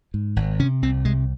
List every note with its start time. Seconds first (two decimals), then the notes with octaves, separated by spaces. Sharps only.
0.14 G#2
0.36 G#1
0.59 C3 C#4
0.82 C2 C4
1.05 C3 G#3